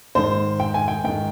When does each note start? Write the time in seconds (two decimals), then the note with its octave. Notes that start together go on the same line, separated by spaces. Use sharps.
0.15 G#2 D#3 C5
0.60 G5
0.74 G#5
0.88 G5
1.04 G#2 D#3 G5